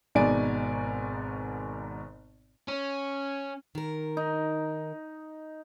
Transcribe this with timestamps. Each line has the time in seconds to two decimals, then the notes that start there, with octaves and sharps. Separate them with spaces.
0.15 G#1 G#2 B2 D5 G#5 D7
2.68 C#4
3.75 D#3 A#4
4.17 D#4